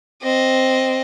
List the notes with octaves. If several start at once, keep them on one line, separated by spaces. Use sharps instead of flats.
C4 D#5